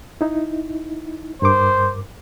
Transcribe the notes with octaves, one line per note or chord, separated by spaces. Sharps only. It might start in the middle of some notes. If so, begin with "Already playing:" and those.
D#4 E4
G2 A#4 C5 D6